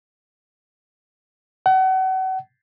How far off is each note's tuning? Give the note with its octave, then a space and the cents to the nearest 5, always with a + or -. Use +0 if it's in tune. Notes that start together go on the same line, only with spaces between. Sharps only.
F#5 +35